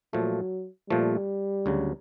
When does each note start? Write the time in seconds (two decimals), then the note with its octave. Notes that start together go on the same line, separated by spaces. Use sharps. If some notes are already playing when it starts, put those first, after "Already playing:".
0.13 A#2 F3 F#3 A3
0.89 A#2 F3 G3 A3
1.66 D2 C#3 F#3